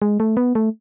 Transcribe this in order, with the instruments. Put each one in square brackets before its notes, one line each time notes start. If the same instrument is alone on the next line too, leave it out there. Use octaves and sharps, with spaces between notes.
[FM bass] G#3
A3
B3
A3